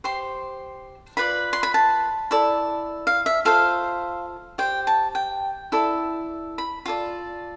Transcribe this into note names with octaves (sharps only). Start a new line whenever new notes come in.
G4 C5 C6
F4 B4 D5 B5
C6
B5
A5
E4 A4 D5
F5
E5
F4 A4 C5 F5
G4 C5 G5
A5
G5
E4 A4 D5
B5
F4 A4 D5